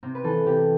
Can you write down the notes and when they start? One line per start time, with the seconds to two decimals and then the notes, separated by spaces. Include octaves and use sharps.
0.03 C3 C4
0.15 B4
0.24 E3 A4
0.46 C3 G4